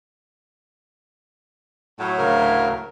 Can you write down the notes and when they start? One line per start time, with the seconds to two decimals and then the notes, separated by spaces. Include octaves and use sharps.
1.99 A2 F#3
2.18 D2 C#3 A#4